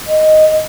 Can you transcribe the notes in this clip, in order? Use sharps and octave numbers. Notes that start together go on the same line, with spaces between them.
D#5